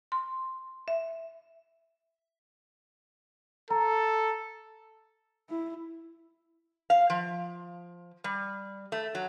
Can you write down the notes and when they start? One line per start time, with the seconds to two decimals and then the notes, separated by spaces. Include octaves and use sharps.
0.12 C6
0.88 E5
3.70 A4 A#5
5.50 E4
6.90 F5
7.10 F3
8.24 G3
8.92 A3
9.15 F#3